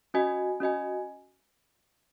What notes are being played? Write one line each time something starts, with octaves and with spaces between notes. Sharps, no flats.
C#4 F#4 D#5 G#5
C#4 F#4 D#5 G#5